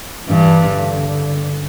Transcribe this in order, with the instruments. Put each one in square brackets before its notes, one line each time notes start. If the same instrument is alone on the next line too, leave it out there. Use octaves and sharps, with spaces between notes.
[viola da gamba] G2 [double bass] E3
[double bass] D3